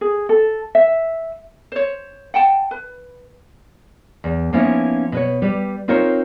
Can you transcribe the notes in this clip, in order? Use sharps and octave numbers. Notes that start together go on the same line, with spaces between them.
G#4
A4
E5
C5 C#5
F#5 G5 A5
B4
E2
F3 A#3 B3 C#4 D#4 E4
B2 B4 C#5
G3 G4 B4
C4 D#4 F4 A#4 C5 C#5